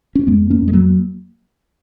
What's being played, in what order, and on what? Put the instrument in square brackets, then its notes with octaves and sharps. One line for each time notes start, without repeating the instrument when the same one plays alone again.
[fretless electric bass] C#4
F2 G#3 B3
A#3 C#4
F2
G#3
F#3 A#3